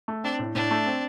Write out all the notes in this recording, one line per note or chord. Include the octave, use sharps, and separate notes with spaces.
A3
C4 D4
A2
A2 D4
A3
C4